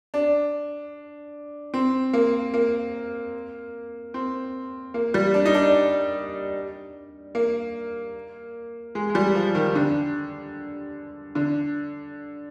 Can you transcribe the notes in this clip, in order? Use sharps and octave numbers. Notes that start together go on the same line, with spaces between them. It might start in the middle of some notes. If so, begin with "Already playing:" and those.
D4
C4
A#3
A#3
C4
A#3
G3
D4
D#4
D4
A#3
G#3
G#3
G3
F3
D#3
D3
D3